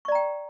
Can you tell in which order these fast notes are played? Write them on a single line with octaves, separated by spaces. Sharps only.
C#6 D5 A#5 G5